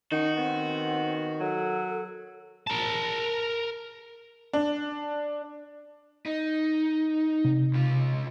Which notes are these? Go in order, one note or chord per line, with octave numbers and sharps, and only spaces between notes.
D#3 C#4 D#4 F#4
B3 C4
F#3 A4
A#4 A5
D4
D#4
C3
C#2 F4